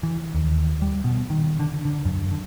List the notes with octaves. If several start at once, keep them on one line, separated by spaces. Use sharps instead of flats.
E3
D#2
G3
B2
D#3
D3
D3
F#2
D3